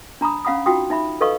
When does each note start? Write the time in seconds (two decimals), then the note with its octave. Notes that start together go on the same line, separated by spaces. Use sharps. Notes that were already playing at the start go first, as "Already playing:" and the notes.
0.21 D4 A#5 B5 D#6
0.45 C#4 F5 F#5 B5 D#6
0.66 D#4 F4 F#4 G5 D#6
0.90 D#4 E5 B5
1.21 A4 B4 D#5 F5 C#6 D#6